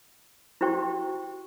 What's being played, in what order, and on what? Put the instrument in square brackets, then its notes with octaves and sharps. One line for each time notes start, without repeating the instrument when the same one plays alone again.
[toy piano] E4 F#4 G4 C5 G5 C#6